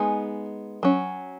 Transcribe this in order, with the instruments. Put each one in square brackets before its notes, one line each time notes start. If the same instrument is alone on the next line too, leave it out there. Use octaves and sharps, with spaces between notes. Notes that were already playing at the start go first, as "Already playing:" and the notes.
Already playing: [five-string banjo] G#3 B3 D#4 G#5
F#3 C#4